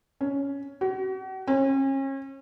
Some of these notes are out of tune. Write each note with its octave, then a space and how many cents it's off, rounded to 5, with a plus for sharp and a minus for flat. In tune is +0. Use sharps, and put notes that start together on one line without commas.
C#4 +10
F#4 +40
C#4 -35